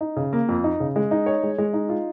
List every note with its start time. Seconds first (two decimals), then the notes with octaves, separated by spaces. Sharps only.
0.01 D#4
0.16 C#3
0.33 A#3
0.49 F2
0.64 D#4
0.80 C#3
0.96 G#3
1.11 D#4
1.26 C#5
1.43 G#3
1.58 G#3
1.73 D#4
1.89 F4